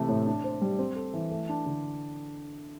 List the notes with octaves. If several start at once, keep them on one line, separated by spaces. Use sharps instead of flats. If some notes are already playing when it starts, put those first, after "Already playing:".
Already playing: C3 E3 A3
A2
D4
C5
G3
C4
A4
E3
A3
D4
D3